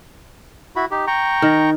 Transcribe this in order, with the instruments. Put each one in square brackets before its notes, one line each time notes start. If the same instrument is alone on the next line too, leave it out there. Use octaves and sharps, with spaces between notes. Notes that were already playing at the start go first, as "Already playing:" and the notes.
[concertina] E4 F#4 B5
D#4 G4
G5 A#5 C#6
[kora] D#3